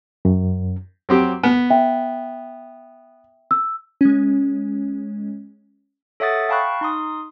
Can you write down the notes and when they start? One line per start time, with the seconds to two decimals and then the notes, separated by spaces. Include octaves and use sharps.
0.25 F#2
1.09 F#3 C4 G4
1.43 B3
1.70 E5 G5
3.51 E6
4.01 G#3 C#4
6.20 A4 C#5 E5 F#5 D#6 A6
6.49 F5 G5 A5 B5 C#6 F#6
6.81 D#4 C6 D#6